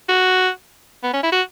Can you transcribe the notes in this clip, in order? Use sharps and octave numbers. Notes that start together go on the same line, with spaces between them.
F#4
B3
C#4
E4
F#4